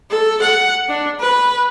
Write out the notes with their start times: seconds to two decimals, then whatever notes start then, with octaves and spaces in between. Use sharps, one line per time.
0.10 A4
0.42 F#5
0.89 D4
1.20 B4